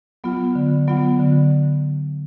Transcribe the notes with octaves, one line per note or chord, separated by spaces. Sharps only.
F#3 B3 F4
D3
F#3 B3 F4
D3